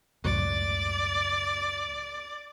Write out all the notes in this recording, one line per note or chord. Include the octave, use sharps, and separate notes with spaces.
C#2 F#2 A2 D5